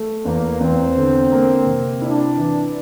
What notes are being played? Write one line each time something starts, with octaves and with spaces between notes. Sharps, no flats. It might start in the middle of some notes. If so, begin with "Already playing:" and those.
Already playing: A3
E2 A#3
E2 C4
D3
A#3
C3
D4 E4
E3